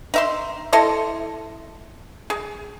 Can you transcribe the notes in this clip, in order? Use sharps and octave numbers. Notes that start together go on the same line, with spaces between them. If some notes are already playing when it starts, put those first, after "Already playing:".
D#4 E5 C6
E4 A4 D#5 C6
G#4